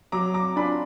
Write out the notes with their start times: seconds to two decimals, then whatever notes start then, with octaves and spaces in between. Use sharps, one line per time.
0.12 F#3 A#5 D6
0.34 A#5 D6
0.56 D4 F4 G#5 B5